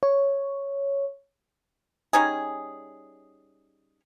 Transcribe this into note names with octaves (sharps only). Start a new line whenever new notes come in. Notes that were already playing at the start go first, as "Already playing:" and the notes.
C#5
G3 C#4 D#4 G#4